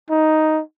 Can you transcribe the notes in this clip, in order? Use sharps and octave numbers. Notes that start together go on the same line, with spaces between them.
D#4